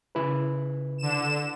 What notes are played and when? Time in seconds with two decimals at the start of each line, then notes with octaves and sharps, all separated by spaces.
0.15 C#3 E4 B4
0.98 D3 E7